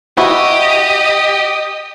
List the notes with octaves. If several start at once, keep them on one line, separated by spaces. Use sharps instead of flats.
E4 F#4 G4 D#5